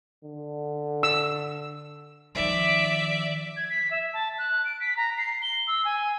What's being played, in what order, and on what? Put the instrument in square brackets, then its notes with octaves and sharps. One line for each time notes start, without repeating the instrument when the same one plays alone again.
[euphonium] D3
[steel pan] E6
[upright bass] D#3 F3 [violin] D5 E5
[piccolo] G#6
B6
E5
A5
F#6
D7
B6
A#5
C7
G7
E6
G#5